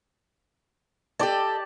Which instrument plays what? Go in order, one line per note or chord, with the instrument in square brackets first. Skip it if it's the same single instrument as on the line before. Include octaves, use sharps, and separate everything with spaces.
[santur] G4 D5 A5 [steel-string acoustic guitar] A4 D#5